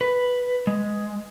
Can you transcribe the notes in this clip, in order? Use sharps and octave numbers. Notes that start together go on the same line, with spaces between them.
B4
G#3